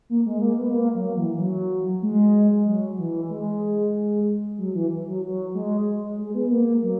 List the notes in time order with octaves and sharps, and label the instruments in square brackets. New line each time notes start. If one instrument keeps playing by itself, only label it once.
[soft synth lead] A#3
G#3
A#3
B3
A#3
F#3
E3
F#3
G#3
F#3
E3
G#3
F#3
E3
F#3
F#3
G#3
G#3
B3
A#3
F#3